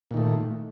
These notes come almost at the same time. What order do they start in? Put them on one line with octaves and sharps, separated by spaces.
A#2 D#3 A3